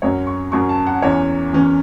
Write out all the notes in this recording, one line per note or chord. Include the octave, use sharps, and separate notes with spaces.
F#2 F#3 C#4 C#5
C#6
F#2 F#3 C#4 C#6
A5
F#5
E2 E3 C#4 C#5
E2 E3 C#4